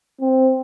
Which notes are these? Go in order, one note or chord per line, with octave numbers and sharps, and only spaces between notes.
C4